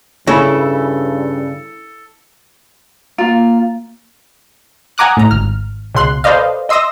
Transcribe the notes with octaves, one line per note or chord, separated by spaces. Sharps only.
G2 C#3 E4 A4
A#3 F4
F#5 G#5 A#5 D6 D#6 F#6
A2 A#5
G#1 F6
C#2 B2 C6 F#6
A4 B4 C5 D5 D#5 F5
D#5 E5 C6 D#6 E6 A#6